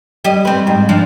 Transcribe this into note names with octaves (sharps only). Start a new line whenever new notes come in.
G3 D#5
C4 B4
G#2
F3 D4